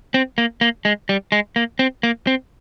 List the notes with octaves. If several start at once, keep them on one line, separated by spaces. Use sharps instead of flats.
C4
A#3
A#3
G#3
G3
G#3
A#3
C4
A#3
C4